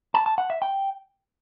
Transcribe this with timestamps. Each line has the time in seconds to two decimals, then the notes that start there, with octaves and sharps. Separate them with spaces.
0.14 A5
0.26 A5
0.38 F#5
0.50 E5
0.62 G5